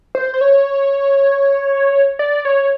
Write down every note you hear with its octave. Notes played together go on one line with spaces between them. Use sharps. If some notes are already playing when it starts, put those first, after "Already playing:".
C5
C5
C#5
D5
C#5